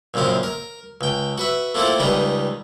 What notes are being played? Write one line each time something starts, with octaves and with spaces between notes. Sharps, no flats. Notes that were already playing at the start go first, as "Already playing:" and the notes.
A#1 F#2 C#3 C4 F5
A#4
C#2 G5
F#4 B4 E5
A3 A#3 C4 E4 F4 A4
C#2 D#3 G3 B4 D#5 A#5